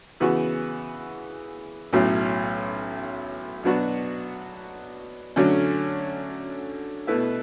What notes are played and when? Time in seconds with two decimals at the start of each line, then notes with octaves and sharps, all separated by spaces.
0.20 C#3 E3 B3 F#4
1.93 B1 A2 F#3 C#4
3.63 B2 F#3 B3 D4 F#4
5.36 D3 F#3 A3 C#4
7.07 B2 A3 E4 B4 E5